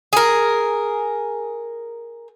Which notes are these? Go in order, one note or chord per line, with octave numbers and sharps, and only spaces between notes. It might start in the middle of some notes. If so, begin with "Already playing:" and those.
G#4 A#4